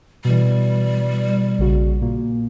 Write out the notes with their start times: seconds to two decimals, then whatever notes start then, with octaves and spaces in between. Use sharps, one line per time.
0.25 B2 E3 G3
1.58 A#1 C#3 F#4
2.02 A#2 A#3